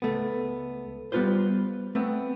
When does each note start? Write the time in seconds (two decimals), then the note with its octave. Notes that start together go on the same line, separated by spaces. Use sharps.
0.02 C#2 A3 B3
1.12 G3 B3 C4 F4 B4 C5
1.95 A3 B3 C4